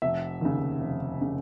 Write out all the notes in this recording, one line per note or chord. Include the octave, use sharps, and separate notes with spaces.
F1 E5
D#2 C#3
F1
C#3